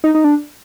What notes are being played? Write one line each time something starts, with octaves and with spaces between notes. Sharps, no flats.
D#4
D#4
D4